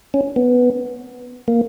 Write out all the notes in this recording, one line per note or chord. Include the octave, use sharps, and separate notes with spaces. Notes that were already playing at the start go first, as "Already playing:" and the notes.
C#4
B3
A#3